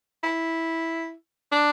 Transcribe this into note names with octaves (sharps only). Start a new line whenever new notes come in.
E4
D4